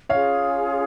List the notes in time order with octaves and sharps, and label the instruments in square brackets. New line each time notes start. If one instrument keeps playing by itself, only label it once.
[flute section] C#4 F4 G#4 [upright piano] C#5 F5